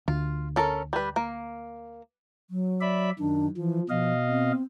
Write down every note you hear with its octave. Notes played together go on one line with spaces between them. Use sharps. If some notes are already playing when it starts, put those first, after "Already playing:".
D2 F4
C#4 A4 A#4
G3 B4
A#3
F#3
D5 E5 B5
F#2 D#3 D4
E3 F3
B2 F3 D#5 F5
C4